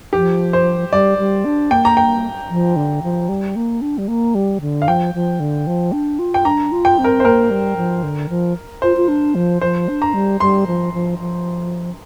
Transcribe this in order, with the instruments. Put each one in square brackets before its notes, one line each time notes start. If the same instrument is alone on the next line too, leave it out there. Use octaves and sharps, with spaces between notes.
[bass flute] F3 [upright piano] G4
[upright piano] C5
[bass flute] G3 [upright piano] D5
[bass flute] G3
D4
[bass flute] A#3 [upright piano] G5
[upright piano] A#5
G5
[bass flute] F3
D3
F3
G3
A#3
D4
G3
A#3
G3
D3
[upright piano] F5
[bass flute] F3 [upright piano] G5
[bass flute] F3
D3
F3
D4
F4
[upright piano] G5
[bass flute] D4 [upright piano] A#5
[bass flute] F4
[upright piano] G5
[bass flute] C4
[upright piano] A#4
C5
[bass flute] A#3 [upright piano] A#4
[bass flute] G3
F3
D3
F3
[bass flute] F4 [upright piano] C5
[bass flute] F4
D4
F3
[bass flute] F3 [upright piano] C5
[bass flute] D4
[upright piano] A#5
[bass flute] G3
[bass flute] G3 [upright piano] C6
[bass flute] F3
F3
F3